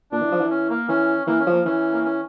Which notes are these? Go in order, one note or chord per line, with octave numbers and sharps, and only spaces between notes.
A#2 D4
E3
F3
E3
C#4
A#3
E3 C#4
E3 A#3
C#4
F3
A#3
E3 C#4
A#3
C#4